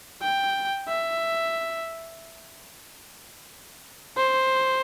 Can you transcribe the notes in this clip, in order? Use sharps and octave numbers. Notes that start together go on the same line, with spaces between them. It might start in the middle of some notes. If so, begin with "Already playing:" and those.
G5
E5
C5